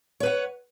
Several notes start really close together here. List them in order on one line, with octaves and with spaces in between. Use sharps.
C#5 B4 F#5